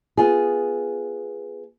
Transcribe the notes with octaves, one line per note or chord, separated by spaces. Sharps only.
B3 F4 G#4